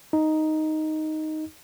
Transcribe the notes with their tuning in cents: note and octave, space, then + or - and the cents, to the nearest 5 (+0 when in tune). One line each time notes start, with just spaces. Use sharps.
D#4 +0